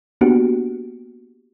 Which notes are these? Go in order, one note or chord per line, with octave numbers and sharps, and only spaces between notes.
A#3 B3 D4 F#4 G4